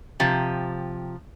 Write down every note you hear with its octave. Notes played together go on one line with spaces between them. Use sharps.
C3 F3 G4